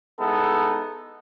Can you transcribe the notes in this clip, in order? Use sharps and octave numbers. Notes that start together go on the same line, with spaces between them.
G#3 B3 D#4 E4 A4